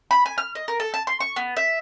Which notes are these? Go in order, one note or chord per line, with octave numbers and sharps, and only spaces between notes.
B5
G#5
F6
D#5
A#4
A4
A5
C6
C#6
B3
E5